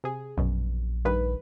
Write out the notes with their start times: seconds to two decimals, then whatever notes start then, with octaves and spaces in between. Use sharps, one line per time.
0.04 C3 G#4
0.37 A#1 F#2 B2
1.05 G2 D#3 B4